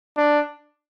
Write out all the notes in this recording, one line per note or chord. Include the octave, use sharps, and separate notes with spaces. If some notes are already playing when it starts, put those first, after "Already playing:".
D4